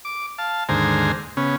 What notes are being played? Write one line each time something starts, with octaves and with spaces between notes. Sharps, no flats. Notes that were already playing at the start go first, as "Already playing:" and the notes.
D6
F5 A5
D#2 G#2 D3 C5 G#5 A#5
C#3 B3 C#4